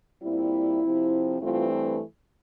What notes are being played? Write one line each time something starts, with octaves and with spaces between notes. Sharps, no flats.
A#2 G3 C4 E4
C3 F3 C4
G2 E3 A3 C4 F4